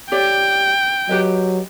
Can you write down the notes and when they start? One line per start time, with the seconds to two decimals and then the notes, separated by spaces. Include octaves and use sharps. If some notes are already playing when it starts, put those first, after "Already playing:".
0.12 G4 C#5 D5 G5
1.09 F#3 G4 B4 D#5